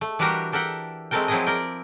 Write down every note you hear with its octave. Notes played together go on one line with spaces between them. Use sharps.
A3
E3 G3 D4 F#4 G4 A#4
G4 A4 A#4 E5 F#5 G5
G#3 A3 C4 A4 A#4 G5
F3 F#3 C4 E4 G#4 D#5
A#4 D5 G5